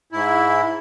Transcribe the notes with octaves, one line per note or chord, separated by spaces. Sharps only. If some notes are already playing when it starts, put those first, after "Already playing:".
G#2 E4